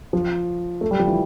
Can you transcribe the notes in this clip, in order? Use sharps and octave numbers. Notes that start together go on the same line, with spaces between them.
F3
A3
G3
F3
E3